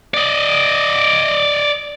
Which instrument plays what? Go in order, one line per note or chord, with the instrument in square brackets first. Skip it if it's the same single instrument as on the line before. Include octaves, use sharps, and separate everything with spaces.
[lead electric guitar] D5 D#5